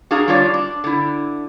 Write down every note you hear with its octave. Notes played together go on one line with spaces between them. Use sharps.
D4 F#4 G#4 F5 A#5
G3 D4 F4 C#5 D5
D4
D3 E4